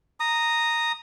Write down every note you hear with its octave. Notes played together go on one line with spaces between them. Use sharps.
A#5 D#6